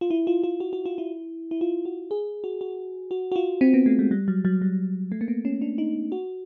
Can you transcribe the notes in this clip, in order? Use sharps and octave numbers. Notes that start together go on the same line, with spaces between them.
F4
E4
F4
F4
F#4
F#4
F4
E4
E4
F4
F#4
G#4
F#4
F#4
F#4
F#4
F4
C4
B3
A3
G#3
G3
F#3
F#3
G3
A3
A#3
B3
C#4
D4
D#4
F#4